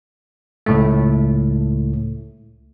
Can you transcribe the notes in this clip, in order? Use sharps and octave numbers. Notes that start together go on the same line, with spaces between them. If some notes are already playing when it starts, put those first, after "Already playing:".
C#2 A2 A3